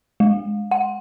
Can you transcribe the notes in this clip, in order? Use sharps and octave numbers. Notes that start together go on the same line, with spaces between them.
G#3
F#5